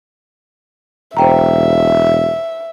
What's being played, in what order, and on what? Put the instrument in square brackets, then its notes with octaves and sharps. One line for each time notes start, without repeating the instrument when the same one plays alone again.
[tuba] E1 [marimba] C5 G5 A#5 [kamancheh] E5